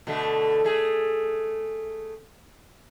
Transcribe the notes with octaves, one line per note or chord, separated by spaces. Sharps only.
B2 D3 A3
A3 G#4